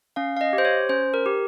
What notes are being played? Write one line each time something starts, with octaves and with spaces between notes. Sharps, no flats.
C#4 F5
F5
D#5
G4
C5
C#5
C#4 C5
A#4
G4